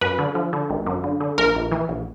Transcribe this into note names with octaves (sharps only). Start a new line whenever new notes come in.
F#2 B4
D3
F3
D3
G#1
F#2
D3
D3
A#1 A#4
A#1
E3
A#1